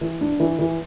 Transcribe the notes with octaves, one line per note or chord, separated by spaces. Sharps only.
E3
D4
E3
E3